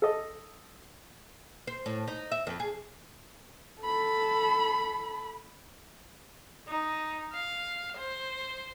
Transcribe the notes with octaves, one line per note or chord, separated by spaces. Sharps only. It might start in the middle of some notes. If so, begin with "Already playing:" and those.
A4 D#5
C5
A2
D#4
E5
F2
G#4
A4 B5
D#4
F5
C5